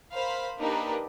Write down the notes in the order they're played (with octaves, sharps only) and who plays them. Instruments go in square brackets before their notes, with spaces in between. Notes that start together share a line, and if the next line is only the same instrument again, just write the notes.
[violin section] A#4 C5 F5 B5
A#3 D4 D#4 G4 A#4 B4